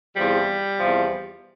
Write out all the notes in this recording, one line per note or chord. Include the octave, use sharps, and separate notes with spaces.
E2 C3 F3 G3
E2 C3 F3